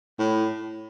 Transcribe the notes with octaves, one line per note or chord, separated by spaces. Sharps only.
A2